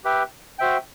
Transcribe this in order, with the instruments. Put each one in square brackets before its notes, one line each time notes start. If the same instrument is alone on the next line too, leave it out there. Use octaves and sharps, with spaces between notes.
[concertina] G4 B4 E5 G5
F#4 C5 E5 G5